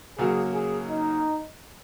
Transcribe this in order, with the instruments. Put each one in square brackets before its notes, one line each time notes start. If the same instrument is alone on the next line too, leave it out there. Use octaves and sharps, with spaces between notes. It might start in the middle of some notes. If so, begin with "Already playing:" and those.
[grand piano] C#3 F#3 A#3 F#4 [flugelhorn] G#4
[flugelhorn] G#4
D#4